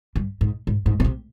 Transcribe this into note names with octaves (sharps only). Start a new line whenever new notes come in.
G2
G#2
G#2
G#2
A#2
C3